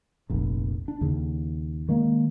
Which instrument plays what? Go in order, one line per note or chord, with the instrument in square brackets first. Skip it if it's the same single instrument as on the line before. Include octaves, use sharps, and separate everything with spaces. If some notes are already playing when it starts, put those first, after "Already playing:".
[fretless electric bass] F1 A#1
D4
D#2 C#3
D#3 G#3 A#3